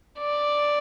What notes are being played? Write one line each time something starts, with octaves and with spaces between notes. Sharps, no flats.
D5